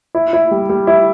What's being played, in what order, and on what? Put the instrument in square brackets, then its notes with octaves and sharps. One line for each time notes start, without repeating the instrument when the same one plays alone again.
[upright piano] E4
E4
G3
G3
E4